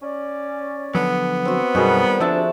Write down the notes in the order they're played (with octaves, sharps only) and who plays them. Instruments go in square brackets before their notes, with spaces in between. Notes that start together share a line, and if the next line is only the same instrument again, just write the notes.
[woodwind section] C#4 D5
[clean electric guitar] D3 F3 F#3 [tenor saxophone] B3
[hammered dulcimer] C4 F#4
[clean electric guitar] F#2 B2 [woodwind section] D#3 G3 [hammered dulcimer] F#4 G#4 A#4
[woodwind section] D2 D4 [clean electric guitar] F3 [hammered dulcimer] D5 E5 A5